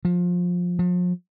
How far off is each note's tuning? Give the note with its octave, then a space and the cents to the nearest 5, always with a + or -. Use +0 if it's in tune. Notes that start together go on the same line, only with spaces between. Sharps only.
F3 +20
F3 +40